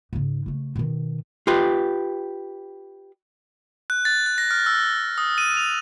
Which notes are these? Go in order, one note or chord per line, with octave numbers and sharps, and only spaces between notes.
G#2 C#3
C#3 A3
B2 D#3
F4 G4 B4
F#6
A6
F#6
A#6
F6
E6
D#6
D#7
F7